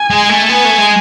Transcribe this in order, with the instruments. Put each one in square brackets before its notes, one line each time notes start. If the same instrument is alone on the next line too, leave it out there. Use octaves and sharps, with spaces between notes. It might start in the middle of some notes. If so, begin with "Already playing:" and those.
Already playing: [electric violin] G#5
[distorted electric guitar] G#3
A3
[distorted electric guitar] B3 [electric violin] G#5
[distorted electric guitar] A3
G#3